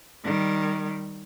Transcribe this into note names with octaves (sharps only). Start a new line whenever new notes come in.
D#3 G3